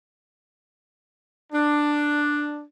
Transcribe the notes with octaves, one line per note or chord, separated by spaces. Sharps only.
D4